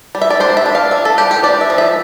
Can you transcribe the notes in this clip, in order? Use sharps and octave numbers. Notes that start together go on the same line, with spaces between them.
G3
E5
D5
D4 C5
E5
D4
F5
D4 E5
A4
G3 G4
G4
D4 D5
E5
F3
E5